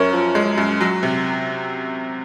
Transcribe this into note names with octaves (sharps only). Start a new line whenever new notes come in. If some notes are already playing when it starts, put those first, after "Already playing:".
Already playing: F#2 A#4 C#5
F3
G#3
F#2
F#3
C3